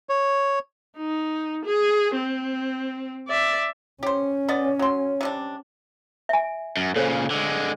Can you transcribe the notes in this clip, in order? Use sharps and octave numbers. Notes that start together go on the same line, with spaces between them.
C#5
D#4
G#4
C4
D5 E5
C#4 G4 C5 C#5
B3 D5 D#5
F#3 C6
C3 G3 D4
E5 G#5
F#2
A#2 C#3 A4 C5 C#5
D3 G#3